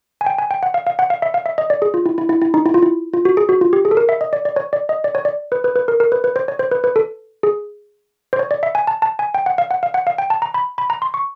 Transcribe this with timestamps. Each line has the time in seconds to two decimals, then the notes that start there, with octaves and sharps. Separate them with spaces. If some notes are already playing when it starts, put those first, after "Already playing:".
0.21 G#5
0.26 G5
0.38 G#5
0.51 G5
0.63 F#5
0.74 F5
0.87 F5
0.99 F#5
1.10 F5
1.22 E5
1.34 F5
1.46 E5
1.58 D#5
1.70 D5
1.82 G#4
1.94 F4
2.06 E4
2.18 E4
2.29 E4
2.42 E4
2.54 D#4
2.66 E4
2.74 F4
2.82 E4
3.14 F4
3.25 F#4
3.37 G#4
3.49 F#4
3.61 F4
3.73 G4
3.85 G#4
3.91 A4
3.97 A#4
4.09 E5
4.21 D#5
4.33 D5
4.45 D5
4.56 C#5
4.73 D5
4.89 D#5
5.04 D5
5.15 C#5
5.25 D5
5.52 B4
5.64 B4
5.76 B4
5.88 A#4
6.00 A#4
6.12 B4
6.24 B4
6.36 C5
6.48 C#5
6.59 C5
6.71 B4
6.84 B4
6.96 A4
7.43 G#4
8.33 C5
8.39 C#5
8.51 D5
8.63 E5
8.75 G#5
8.87 A5
9.02 A5
9.19 G#5
9.34 G5
9.46 F#5
9.58 F5
9.71 F#5
9.83 F5
9.94 F#5
10.07 F5
10.18 G5
10.30 A5
10.42 A#5
10.54 B5
10.78 B5
10.90 A#5
11.02 C6
11.14 C#6